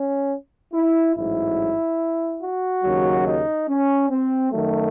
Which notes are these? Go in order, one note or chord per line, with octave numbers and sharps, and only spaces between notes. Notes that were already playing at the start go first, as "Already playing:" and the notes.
Already playing: C#4
E4
A1 G#2 F#3 E4
F#4
D#2 C#3 F#3
D#4
C#4
C4
F#2 D#3 F#3 A3